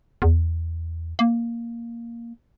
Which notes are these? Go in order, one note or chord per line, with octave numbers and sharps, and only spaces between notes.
E2
A#3